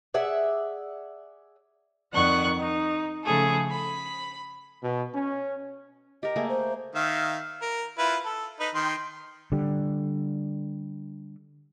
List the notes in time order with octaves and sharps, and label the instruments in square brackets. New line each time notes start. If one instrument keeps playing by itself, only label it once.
[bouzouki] G#4 D5 E5 F#5
[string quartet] F2 D#3 D5 F#5 C#6 F#6
D#4
C#3 F3 A3 G#4 A4
B5
[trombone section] B2
C#4
[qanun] G4 A#4 [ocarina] D#5
[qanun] A3 A#3 G#4
[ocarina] C5
[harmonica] D#3 E5 F5
A#4
E4 F4 B4
A4
D#4 B4
D#3 G5 C6
[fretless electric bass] D3 G3